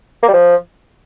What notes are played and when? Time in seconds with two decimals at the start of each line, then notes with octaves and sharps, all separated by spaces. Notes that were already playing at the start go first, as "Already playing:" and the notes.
0.23 A#3
0.28 G3
0.34 F3